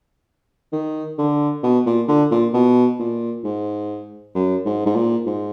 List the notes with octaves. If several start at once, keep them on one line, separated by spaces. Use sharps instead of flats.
D#3
D3
B2
A#2
D3
A#2
B2
A#2
G#2
F#2
G#2
G#2
A#2
G#2